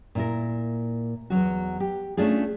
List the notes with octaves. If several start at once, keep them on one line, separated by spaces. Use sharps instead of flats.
A#2 E4 A#4
E2 G2 F#3 F#4
G4
A3 C#4 D4 F4 G#4